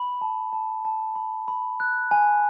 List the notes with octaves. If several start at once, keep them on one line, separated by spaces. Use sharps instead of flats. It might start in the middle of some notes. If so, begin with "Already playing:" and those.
Already playing: B5
A5
A5
A5
B5
B5
F#6
G#5